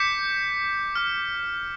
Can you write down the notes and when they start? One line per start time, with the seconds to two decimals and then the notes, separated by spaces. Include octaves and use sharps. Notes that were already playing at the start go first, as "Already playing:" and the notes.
Already playing: D6 G6 B6 C#7
0.95 D6 F6